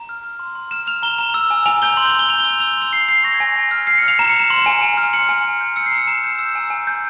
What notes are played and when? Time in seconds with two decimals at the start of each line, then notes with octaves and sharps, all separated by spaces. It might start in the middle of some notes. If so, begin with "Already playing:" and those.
Already playing: A#5
0.09 F6
0.24 F6
0.39 C6
0.55 C6
0.71 F6 E7
0.87 F6 F7
1.03 A#5 G7
1.18 A#5
1.34 E6
1.51 G#5
1.66 G#5 F7
1.82 G6 G7
1.97 C6
2.09 F7
2.14 G6
2.19 G7
2.29 G#5 F7
2.40 G7
2.44 E6
2.50 G7
2.60 E6 F7
2.72 G7
2.77 C6 F7
2.92 C6 C7
3.09 G6 C7
3.24 C#6 A#6
3.34 G#6
3.40 G#5
3.56 G#5
3.71 F6
3.87 F6 C7
3.98 C#7
4.02 F6
4.08 F7
4.19 A#5 E7
4.29 C#7
4.35 A#5 E7
4.50 C6
4.66 G#5
4.81 G#5
4.97 F6
5.13 C6 C#7
5.29 G#5
5.45 G#5
5.61 G6
5.76 E6 C#7
5.86 C7
5.91 A#5
5.98 C#7
6.07 A#5 E7
6.24 G6
6.39 E6
6.55 G#5
6.70 G#5
6.87 G6